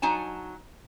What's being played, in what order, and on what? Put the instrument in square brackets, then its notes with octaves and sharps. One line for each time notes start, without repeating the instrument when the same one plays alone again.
[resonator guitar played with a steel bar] F#3 D#4 G#5 A5